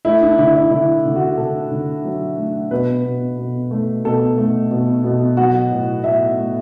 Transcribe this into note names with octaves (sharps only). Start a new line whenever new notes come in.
A3 E4
D4
D3 E4
E4
D3 E4
D3
F#4
D3 A4
D3
F#3
A3
B2 B4
B2
B2
A3
B2 A4
A3
B2
B2
F#3 F#4
A2
A2 E5
A3